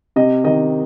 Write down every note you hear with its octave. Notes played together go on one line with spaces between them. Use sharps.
C3 D#5
D#3 D#5